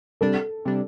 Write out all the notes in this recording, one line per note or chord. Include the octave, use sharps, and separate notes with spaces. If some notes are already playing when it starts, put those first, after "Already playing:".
C3 G3 D4 A4
C3 G3 D4